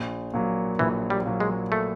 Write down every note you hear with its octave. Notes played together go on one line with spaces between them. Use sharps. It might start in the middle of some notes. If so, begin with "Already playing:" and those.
Already playing: A#1
A#2 F#3
A#1 E3
G3
A#2 F#3
G#3
A3